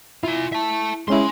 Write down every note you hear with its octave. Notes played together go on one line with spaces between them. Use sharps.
E4 F4 G#5
E5 A5
G#3 C#4 E4 G#5 C6